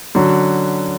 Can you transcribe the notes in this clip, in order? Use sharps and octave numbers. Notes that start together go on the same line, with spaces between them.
D3 F#3 C#4 F#4